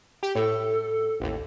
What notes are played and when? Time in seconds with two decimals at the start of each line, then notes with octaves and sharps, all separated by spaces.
0.23 G4
0.35 A2 A4
1.20 A1 D#2